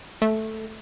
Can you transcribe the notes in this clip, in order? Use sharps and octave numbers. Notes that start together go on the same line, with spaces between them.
A3